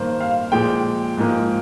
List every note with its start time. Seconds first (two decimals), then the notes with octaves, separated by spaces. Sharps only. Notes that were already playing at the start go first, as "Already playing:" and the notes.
Already playing: G2 D#3 A#3 C5
0.20 F5
0.52 A#2 F3 G#3 G5
1.17 G#2 F3 A#3